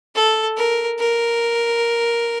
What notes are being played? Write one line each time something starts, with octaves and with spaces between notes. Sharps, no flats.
A4
A#4
A#4